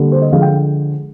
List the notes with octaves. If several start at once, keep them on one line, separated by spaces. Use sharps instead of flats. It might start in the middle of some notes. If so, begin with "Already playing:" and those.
Already playing: D3 G3 A#3
C5
D#5
D3 F3 G#3 F5
G5